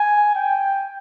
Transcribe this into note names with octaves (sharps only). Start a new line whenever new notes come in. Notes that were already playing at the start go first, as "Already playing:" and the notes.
Already playing: G#5
G5